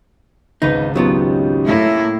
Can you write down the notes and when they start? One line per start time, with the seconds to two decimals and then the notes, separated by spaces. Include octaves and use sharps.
0.62 G#1 C#2 D#4 B4
0.96 F#3 B3 C#4 D#4 F4 G4
1.65 A2 A#3 E4